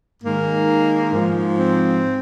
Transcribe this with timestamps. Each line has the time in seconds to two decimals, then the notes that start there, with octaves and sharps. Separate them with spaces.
0.23 G#2 D#3 A#3
1.13 G#2 F3
1.58 C4